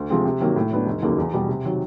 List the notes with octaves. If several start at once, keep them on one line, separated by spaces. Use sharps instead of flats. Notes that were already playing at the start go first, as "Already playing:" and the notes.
Already playing: D2
C3 F3 G#3 C4
C3
D#3 F#3 A#3
A2
F#3 B3 D4
F1
D#2 C#3 F#3 A#3
E2
B2 G3
C3
D#3 F#3